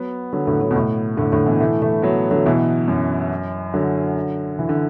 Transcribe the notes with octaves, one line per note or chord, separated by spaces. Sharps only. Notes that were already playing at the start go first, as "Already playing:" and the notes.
Already playing: F#3 B3
D3 F#3
A2 D3
D3 F#3
B2
A2
A2 D3
A2 D3
B2 E3
E3 A3
E3 A3
F#3 B3
D3 F#3
B2 E3
F#2
D3 F#3
E3
D3